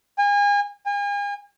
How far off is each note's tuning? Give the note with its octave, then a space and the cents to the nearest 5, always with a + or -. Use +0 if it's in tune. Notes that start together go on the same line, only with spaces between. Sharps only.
G#5 -35
G#5 -40